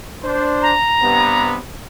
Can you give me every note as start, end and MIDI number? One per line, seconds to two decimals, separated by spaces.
0.24 0.74 62
0.24 0.74 72
0.62 1.50 82
1.01 1.59 43
1.01 1.59 48
1.01 1.59 59